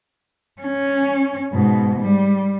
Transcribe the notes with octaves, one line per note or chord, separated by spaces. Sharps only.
C#4
G#2 B2
G3